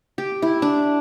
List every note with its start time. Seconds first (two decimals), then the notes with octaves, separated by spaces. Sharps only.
0.18 G4
0.42 E4
0.62 D4